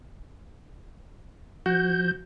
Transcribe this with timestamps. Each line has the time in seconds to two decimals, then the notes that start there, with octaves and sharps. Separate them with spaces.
1.66 F3 F#4 G6